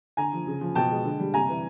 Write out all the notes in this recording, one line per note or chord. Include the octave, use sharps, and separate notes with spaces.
D3 G#5 A#5
F3
C#3
F3
B2 G5 A5
G#3
D3
G3
C3 G#5 A#5
E3